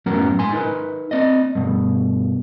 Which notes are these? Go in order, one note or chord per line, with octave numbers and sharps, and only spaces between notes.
F#2 A2 F#3 B3 C#4 A#4
G#2 G#5 C6
D#4 A#4 B4
C4 D5 D#5
G2 B2